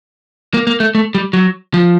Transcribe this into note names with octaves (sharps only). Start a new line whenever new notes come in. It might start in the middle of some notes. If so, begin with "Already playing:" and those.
A#3
A#3
A3
A3
G3
F#3
F3